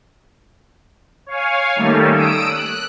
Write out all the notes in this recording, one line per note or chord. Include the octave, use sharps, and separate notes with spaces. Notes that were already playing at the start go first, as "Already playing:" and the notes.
C#5 F5 G#5
D#3 G3 A3 A#3 C#4 A4
D#6 E6 D7
F#6